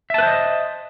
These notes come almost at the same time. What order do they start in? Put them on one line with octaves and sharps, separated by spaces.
E5 A5 B4 C5 D#5